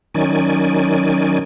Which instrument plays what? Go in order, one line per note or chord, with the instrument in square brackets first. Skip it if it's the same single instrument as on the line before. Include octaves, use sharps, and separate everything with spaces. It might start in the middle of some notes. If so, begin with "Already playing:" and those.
[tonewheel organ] D#3 F#3 C#4 D#4 D5 G#5